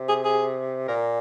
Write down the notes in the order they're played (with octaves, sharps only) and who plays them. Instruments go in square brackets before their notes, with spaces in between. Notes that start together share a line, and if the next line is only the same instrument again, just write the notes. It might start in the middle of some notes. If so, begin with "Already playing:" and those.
Already playing: [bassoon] C3
[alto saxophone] G#4
G#4
[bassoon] A#2 [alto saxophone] A#4